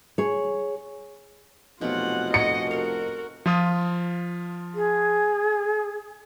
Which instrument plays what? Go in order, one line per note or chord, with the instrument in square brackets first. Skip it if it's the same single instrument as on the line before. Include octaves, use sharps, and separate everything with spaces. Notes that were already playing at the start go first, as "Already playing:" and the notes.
[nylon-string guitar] G#4 C#5
[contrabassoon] F1 [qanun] B2 F#3 [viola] F4 F#5
[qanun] F#4 G#4 A4 [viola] D#5 [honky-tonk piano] C#7
[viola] F#4 A#4 [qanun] F5 C6
[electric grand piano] F3 F4 D#6
[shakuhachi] G#4